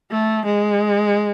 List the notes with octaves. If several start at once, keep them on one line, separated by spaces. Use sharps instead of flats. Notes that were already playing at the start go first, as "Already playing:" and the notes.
A3
G#3